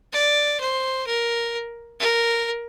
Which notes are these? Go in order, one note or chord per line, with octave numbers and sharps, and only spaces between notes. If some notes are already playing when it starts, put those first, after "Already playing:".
D5
C5
A#4
A#4